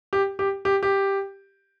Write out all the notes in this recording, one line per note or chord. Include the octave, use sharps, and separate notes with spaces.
G4
G4
G4
G4